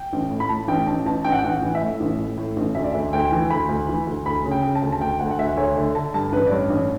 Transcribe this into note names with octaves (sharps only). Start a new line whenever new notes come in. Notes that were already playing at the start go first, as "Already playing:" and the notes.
Already playing: G5
A1
A2
B5
A2 A5
A1 G5
A1 A5
A1 A5
A1 G5
F#5
G5
A1
F#5
E3
E5
A2
A1
A2
A2
A1
D2 E5
D5
D2 E5
D2 G5
E3
D2 B5
D2
E3
D2
D2 B5
C#3
G5
C#3
A5
D2
A5
D2 G5
D2 F#5
F#5
D2 E5
D2 C#5
D3 E5
D3 A5
G2 A5
A1 B4
D5
G2 C#5
A1